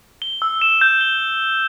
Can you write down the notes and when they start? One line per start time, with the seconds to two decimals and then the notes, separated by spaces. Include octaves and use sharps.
0.22 G7
0.42 E6
0.61 E7
0.81 G6
1.01 G7